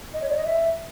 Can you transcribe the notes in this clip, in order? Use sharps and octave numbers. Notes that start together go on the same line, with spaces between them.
D#5
C#5
D5
D#5
E5